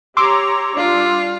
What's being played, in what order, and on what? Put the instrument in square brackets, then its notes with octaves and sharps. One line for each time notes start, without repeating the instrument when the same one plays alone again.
[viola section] G4 C#5 A#5 [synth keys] C6 D6 E6
[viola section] G3 D4 [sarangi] F4